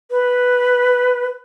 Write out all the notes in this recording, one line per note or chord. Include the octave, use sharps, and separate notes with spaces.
B4